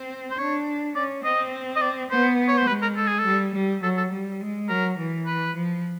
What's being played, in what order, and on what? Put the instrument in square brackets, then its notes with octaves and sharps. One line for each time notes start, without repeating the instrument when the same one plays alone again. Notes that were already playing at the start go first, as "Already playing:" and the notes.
Already playing: [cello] C4
[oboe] C5
[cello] D4 [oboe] C#5
[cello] C#4 [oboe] D5
[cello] C4 [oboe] D#5
[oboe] D#5
D5
[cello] B3 [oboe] C5
[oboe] C#5
C5
[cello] G#3 [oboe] B4
[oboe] A#4
A4
G#4
A4
[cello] G3
G3
[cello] F#3 [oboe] A4
[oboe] A4
[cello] G3
G#3
[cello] F#3 [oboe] A#4
[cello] E3
[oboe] B4
[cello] F3